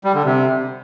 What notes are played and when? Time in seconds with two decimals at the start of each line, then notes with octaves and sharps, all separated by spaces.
0.04 G3
0.14 D3
0.25 C3